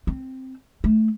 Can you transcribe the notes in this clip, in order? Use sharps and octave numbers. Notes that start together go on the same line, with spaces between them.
C4
A3